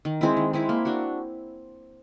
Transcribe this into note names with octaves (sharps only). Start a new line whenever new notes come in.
D#3
G#3 C4 E4
D#3
G#3 C4 E4
A#3
D4 F#4